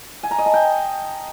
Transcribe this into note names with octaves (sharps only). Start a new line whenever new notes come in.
G#5
A#5
D#5
A5
G5